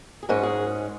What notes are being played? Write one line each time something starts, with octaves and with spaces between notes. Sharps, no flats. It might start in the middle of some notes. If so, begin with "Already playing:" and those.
G#4
G#2 G#3 C#4 A#4
G#4